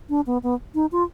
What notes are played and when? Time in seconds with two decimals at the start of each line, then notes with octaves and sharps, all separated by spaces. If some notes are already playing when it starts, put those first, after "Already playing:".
0.09 D4
0.26 B3
0.43 B3
0.75 D#4
0.92 F4